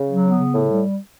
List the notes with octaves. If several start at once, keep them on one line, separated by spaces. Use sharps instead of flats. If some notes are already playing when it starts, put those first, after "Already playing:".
Already playing: C#3
F#3
B3
C#3
A2
G3